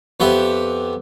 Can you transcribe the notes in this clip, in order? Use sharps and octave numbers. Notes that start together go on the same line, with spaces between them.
F2 B3 G4 E5